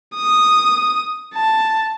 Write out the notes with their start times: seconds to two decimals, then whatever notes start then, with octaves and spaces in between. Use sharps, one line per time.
0.16 D#6
1.34 A5